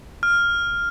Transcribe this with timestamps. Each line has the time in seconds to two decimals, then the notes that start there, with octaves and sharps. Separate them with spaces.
0.23 F6